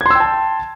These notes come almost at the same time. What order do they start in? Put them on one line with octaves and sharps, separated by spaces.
G#6 C6 E6 G5 A5